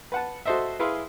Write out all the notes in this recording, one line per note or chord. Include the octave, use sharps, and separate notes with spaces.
B4 F#5 A5
F#4 A4 C5 D#5 E5
E4 G#4 B4 E5 F5 C6